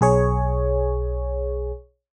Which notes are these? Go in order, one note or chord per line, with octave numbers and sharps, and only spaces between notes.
B1 G#4 C#5